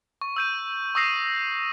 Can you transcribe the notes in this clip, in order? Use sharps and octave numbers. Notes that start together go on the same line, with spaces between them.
C#6
E6 G6 D#7
C#6 D#6 E6 A#6 C7 D#7